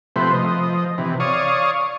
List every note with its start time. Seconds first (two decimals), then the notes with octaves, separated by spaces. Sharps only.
0.16 C3 F3 A3 B4 C5
0.34 F3 D#5
0.98 C3 E3
1.20 C#5 D5 F5 C#6 D#6